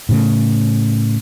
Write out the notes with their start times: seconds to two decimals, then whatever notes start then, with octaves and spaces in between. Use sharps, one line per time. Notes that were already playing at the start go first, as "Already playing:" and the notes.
0.09 A2 C#3 A3